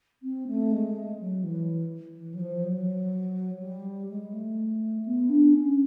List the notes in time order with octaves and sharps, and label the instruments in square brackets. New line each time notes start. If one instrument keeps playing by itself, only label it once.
[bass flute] C4
A3
G#3
F#3
E3
E3
F#3
F3
F#3
G3
G#3
A3
B3
D4
C#4